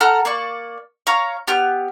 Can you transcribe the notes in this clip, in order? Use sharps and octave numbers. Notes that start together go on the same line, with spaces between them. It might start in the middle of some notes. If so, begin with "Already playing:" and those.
A4 F#5 A#5 F6
A#3 D5 C#6
C#5 F5 A#5
B3 G4 F6